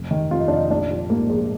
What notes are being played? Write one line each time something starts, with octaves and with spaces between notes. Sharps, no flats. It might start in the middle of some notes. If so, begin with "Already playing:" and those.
Already playing: F1
D#3
F2 F4
D#4
F1 D4
D#4
A#1 D4
F3
G#2 A#3
A#1 G#3